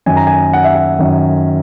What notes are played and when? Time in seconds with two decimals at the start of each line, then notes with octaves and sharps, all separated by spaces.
0.06 F#2 D#3 G#5
0.17 A#5
0.27 G#5
0.53 F#5
0.64 E5
0.75 F#5
0.99 F#2 D#3